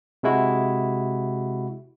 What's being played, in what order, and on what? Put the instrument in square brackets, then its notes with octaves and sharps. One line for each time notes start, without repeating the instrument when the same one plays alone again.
[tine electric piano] C3 G#3 E4 F#4